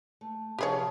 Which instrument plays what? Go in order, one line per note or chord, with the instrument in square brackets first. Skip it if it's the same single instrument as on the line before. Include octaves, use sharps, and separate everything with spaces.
[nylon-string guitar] A3
[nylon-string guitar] C3 F3 [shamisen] G4 G#4 C#5